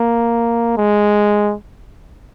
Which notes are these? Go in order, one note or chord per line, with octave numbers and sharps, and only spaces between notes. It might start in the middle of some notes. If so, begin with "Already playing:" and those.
Already playing: A#3
G#3